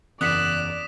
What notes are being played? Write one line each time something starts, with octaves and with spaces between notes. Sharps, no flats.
F#1 E2 D5 D#6 F#6 B6 E7